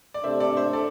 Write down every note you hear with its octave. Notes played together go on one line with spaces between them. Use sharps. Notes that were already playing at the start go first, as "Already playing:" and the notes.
D5
C3 A3 D4 C5 E5
A4 D5
C5 E5
A4 D5